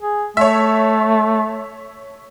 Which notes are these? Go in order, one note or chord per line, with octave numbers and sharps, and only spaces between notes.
G#4
A3 C#5 E5